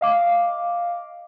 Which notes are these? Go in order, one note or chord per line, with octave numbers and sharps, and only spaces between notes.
D#5 F5 D6